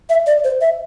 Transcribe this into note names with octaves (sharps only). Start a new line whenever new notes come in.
E5
D5
C5
E5